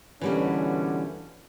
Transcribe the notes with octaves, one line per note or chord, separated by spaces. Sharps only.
B2 D3 E3 G3 A#3 C#4